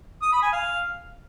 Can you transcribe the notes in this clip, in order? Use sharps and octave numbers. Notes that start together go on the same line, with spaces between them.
D#6
B5
G#5
F5